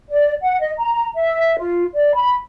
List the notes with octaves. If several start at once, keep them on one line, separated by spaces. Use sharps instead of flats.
D5
F#5
D#5
A#5
E5
F4
D5
B5